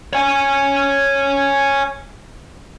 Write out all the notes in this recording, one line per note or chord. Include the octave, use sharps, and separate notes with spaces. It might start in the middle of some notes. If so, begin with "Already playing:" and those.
C#5 G#5